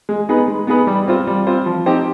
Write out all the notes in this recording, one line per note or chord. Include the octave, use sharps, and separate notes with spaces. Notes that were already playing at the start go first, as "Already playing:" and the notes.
G#3
B3 D#4 G#4 B4
G#3
B3 D#4 G#4 B4
G3
C4 F4 C5
G3
C4 F4 C5
F3
C4 D#4 G4 C5